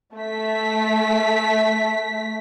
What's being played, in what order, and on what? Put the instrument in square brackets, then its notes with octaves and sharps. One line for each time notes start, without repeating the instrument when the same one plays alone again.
[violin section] A3 B6